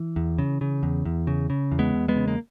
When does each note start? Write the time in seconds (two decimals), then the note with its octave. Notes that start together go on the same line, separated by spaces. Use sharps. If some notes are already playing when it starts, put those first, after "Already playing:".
Already playing: E3
0.16 E2
0.38 C#3
0.61 C#3
0.83 E2
1.05 E2
1.27 C#3
1.50 C#3
1.72 E2
1.79 G#3 B3
1.94 E2
2.08 G#3 B3
2.16 C#3
2.28 A#3